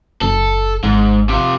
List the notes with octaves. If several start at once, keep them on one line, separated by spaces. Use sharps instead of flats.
F#1 A4
G#1 G#2
C3 F4